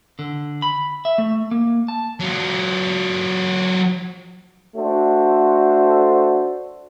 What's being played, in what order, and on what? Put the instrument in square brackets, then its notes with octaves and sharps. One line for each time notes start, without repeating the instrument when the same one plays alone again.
[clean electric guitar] D3
B5
E5
A3
A#3
A5
[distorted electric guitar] F#3 F4
[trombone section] A3 D4 F#4 A4 C5